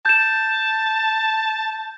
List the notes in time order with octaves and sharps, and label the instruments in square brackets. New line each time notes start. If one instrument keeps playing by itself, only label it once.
[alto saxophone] A5 [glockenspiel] G6 E7